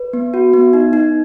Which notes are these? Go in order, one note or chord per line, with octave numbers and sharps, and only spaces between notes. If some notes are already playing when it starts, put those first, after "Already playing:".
Already playing: B4
B3
F#4
B3
D#4
D#4